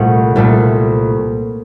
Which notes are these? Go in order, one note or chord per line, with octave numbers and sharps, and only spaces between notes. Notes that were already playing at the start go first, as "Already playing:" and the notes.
Already playing: C2 A#2 A3 F#5
C2 A#2 A3